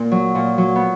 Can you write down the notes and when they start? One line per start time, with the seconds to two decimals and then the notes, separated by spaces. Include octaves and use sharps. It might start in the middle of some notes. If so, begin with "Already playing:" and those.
Already playing: A#2 A#3
0.11 F#3
0.35 A#2
0.58 F#3
0.76 B3